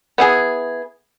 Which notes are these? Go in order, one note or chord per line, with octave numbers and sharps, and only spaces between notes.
B3 E4 G#4